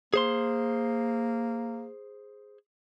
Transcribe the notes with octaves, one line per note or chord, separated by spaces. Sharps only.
A#3 G#4 C5 C6